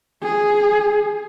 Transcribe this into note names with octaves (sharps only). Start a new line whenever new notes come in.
G#4